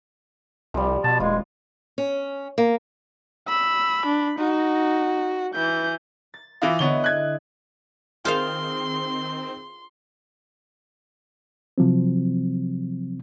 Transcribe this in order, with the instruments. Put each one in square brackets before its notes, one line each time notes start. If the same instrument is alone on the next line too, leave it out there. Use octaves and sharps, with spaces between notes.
[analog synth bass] C2 [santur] F3 G3
[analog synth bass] B2 [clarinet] A5
[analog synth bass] D#1 [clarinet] G#3 [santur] F4
[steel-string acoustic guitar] C#4
A#3
[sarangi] B5 [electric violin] E6
[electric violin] D4
[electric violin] D#4 [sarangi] F#4
[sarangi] E3 [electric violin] G6
[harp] A6
[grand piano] E3 E4 F4 [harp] D#6 A#6 D7
[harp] D3 E4 D#5 [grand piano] B3 C#5 G7
[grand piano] F#6 G#6
[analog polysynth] D#3 C4 [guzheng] F4 C5 F5 [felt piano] G#4 A#4 [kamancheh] C6
[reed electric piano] C3 F3 F#3 C4